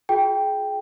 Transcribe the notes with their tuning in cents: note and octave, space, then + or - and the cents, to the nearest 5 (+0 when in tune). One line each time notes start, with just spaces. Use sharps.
F4 +40 G#4 +25 G5 +0